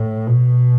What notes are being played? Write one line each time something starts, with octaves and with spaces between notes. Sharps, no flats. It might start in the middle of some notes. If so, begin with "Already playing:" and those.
Already playing: A2
B2